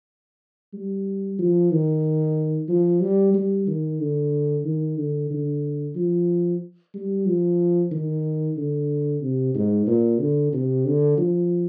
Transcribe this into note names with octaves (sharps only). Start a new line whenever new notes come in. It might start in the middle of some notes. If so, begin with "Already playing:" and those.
G3
F3
D#3
F3
G3
G3
D#3
D3
D#3
D3
D3
F3
G3
F3
D#3
D3
C3
G#2
A#2
D3
C3
D3
F3